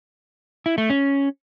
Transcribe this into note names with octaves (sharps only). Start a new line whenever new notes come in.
E4
A3
C#4